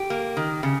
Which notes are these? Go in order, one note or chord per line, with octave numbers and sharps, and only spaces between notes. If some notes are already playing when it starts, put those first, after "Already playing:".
Already playing: G4
A#3
D#3
C#3